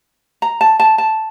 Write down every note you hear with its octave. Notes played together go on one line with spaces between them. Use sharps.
A#5
A5
A5
A5